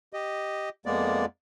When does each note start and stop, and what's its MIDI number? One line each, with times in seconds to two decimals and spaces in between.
0.13 0.69 67
0.13 0.69 75
0.86 1.25 41
0.86 1.25 56
0.86 1.25 58
0.86 1.25 59
0.86 1.25 74